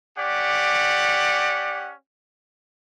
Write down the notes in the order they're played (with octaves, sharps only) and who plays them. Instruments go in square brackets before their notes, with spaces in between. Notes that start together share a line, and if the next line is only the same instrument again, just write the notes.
[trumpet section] C#4 G4 D5 F#5